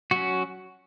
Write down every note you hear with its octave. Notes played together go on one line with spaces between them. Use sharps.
F#3 C#4 F#4